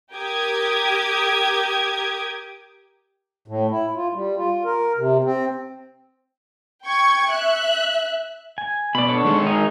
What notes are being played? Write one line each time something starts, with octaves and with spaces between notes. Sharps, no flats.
G4 A#4 D6 D#6 G#6
A2
E4
F4
G3
F4
A#4
C3
C4
G5 C#6 G#6
E5 F#6
G#5
B2 D5 B5
D4 A4 C#5
D#3 G#3 G#4
D#4 A#4 G#5